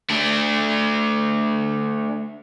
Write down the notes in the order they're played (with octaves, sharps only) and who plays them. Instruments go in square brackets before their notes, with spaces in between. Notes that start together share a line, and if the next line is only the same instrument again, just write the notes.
[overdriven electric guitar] A3 D4